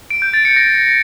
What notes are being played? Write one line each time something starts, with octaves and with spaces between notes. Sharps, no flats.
D7
G6
A6
C#7
A#6